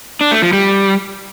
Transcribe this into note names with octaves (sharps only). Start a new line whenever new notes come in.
D4
A3
F3
G3